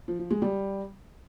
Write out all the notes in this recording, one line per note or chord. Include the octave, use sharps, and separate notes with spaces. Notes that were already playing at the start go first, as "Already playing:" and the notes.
F3
F3
G#3
G3